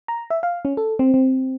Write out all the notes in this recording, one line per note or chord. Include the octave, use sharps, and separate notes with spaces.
A#5
E5
F5
C#4
A4
C4
C4